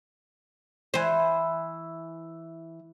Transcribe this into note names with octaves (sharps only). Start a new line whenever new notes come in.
E3 C5